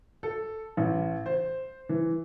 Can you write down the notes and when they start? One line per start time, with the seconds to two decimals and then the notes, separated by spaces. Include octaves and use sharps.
0.23 A4
0.77 A1
1.26 C5
1.89 E3